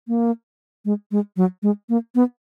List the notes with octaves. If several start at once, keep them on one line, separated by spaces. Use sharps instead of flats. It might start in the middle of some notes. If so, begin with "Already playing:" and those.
A#3
G#3
G#3
F#3
G#3
A#3
B3